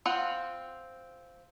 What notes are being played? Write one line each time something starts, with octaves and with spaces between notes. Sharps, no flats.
C4 F4 F#5